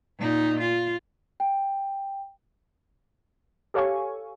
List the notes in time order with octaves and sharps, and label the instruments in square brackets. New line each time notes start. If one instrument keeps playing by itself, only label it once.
[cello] A#2 D#4
F4
[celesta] G5
[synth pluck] G4 A4 C#5 F5 G#5 C#6